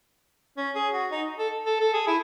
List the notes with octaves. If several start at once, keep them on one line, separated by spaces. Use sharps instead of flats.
C#4
G#4
F#4
D#4
A4
A4
A4
G#4
E4